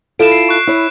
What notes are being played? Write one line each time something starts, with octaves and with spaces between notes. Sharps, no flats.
E4 F4 A4 D7 E7
C7
C#6 F#6 C7
E4 C#5